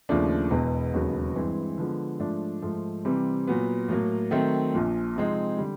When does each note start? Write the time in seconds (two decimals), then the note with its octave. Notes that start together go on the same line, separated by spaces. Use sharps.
0.09 D#2 C#3 F3 A3 D4
0.51 E1 E2 B2
0.94 E1 D#2 C#3 F#3 B3
1.36 G2 E3 G#3 C4 E4
1.78 D3 F3 G#3 B3
2.20 G#2 F3 A3 D4
2.62 G#2 F3 A3
3.05 C3 E3 G3 C4
3.47 A#2 F#3 B3
3.89 A2 F#3 A#3
4.31 D#3 F#3 A3 C4
4.73 A#1 A#2 F3
5.16 C3 F3 G#3 C4 D#4
5.58 D3 G3